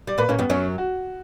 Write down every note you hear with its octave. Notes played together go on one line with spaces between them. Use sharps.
G3 D5
A#2 A#3 B4
A#2 A#3 C#4
G2 G3 B3
F#2 F#3 C#4
F#4